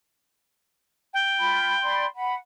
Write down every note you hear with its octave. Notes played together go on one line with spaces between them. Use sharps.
G5
F4 B5
D5 B5 C6
F#5 B5